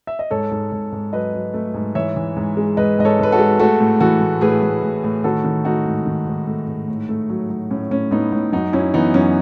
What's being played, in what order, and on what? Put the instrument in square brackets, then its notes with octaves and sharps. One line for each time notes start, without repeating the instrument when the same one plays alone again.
[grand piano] E5
D#5
G#2 A4 C#5
G#2
G#2
G#2
F#3 B4 D#5
F#3
A3
G#2
E3 C#5 E5
E3
G#2
G#3
G#2 B4 D#5
G#2 D#5
A4 C#5
G#2 B4
F#4 A4
G#3
A3 F#4 A4
A2
E3 F#4 A4
A2
A2 G#4 B4
A2
A2
A2
D#3 F#4 A4
D#3
A3 D#4 F#4
G#2
D#3
G#2
A3
G#2
A2
A3
F#3
F#3
A2 C#4
A2 C#4
A2 B3 D#4
A2
F#2 D#4 F#4
F#2 C#4 E4
E3 B3 D#4
F#2 C#4